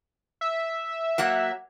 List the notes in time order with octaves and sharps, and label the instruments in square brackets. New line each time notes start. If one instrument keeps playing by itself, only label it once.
[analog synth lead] E5
[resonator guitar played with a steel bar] F#3 A#3 F#5